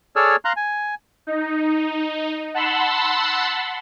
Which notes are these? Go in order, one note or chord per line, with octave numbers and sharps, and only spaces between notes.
G#4 A4 C#5 D5 E6 F6
F5 A#5 C6 F#6
G#5
D#4
F#5 A5 B5 C6 E6